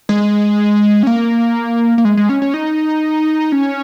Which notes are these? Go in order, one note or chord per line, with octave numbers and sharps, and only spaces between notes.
G#3
C#4
A#3
A#3
G#3
G#3
C#4
C#4
D#4
C#4